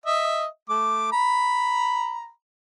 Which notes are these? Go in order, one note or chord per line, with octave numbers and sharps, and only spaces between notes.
D#5 E5
A3 D6
A#5 B5